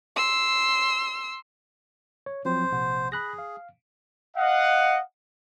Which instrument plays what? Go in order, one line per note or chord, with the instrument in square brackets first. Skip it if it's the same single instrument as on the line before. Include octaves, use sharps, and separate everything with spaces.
[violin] C6 E6
[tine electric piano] C#5
[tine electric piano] F3 F#3 C4 [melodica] C5
[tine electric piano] A#1 C3 F#5
[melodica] G#4 [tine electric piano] B5 F#6 A#6
[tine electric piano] F5
[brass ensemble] D#5 F5 F#5